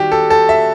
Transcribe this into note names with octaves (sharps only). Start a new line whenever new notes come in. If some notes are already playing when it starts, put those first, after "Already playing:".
Already playing: D#3 G3 F#4 G4
A4
A4
E5